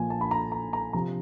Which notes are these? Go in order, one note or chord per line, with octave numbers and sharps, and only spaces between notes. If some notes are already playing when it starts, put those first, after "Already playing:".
Already playing: A#2 F3 G#5
A5
B5
A#5
A#5
A#5
C3 F3 A#5